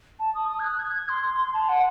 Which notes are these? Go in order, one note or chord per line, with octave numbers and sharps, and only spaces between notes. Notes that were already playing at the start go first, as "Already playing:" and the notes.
A5
D#6
D#6
G#6
F#6
G#6
G#6
C6
C6
C6
A5
F#5